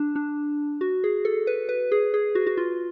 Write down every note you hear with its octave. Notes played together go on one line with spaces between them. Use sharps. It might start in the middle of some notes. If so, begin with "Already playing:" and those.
Already playing: D4
D4
F#4
G#4
A4
B4
B4
G#4
G#4
F#4
F#4
F4